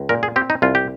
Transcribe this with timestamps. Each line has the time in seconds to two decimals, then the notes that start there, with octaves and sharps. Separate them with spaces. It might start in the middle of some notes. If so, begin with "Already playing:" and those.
Already playing: C#2
0.09 A#2 A#4
0.23 G#4
0.36 C4 G4
0.50 D#4
0.62 C2 F4
0.75 G4